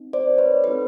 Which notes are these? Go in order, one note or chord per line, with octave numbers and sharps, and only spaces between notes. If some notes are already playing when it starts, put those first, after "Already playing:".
Already playing: C4 D#4
C5 D5
B4 C#5
C4 D#4 F#4 A4 B4